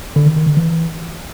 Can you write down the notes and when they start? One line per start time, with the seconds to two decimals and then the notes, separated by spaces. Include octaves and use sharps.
0.16 D3
0.26 D#3
0.36 D#3
0.47 D3
0.57 E3